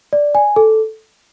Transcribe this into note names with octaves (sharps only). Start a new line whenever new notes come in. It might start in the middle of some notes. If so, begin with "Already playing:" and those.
D5
G#5
A4